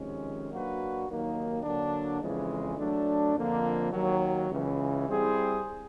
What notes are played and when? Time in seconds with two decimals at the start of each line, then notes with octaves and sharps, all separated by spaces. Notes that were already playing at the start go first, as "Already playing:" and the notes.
Already playing: F2 C3 D#3 G#3 C#4
0.49 F#3 A#3 D4 F#4 B4
1.07 D#2 D#3 F#3 A#3 D#4
1.63 D3 F#3 A#3 D4
2.21 F2 C#3 E3 G#3
2.78 F#3 A3 D4
3.34 F2 D3 F3 A#3
3.92 D#2 D#3 F#3
4.49 C#2 C#3 E3
5.06 G3 C4 E4 G#4 C5